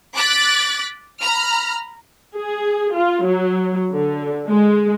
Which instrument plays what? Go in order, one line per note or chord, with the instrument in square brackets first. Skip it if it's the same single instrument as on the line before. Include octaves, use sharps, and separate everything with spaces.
[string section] D6 F#6 A6 B6
A#5 B5 F6
[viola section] G#4
F4
F#3
D3
G#3